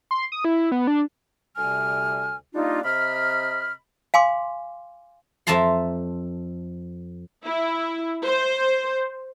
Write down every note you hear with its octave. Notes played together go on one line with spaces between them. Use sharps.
C6
D#6
E4
B3
D4
D2 C3 G3 G#5 F6
G3 A#3 D4 D#4 F4
C3 D#5 B5 F6
F5 G#5 C6 D6
F2 E5 A5 A#5 C6
E4
C5